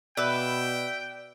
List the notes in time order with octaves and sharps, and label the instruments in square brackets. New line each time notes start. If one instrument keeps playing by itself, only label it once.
[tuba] B2 [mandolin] B4 E5 [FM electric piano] D5 [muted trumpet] G5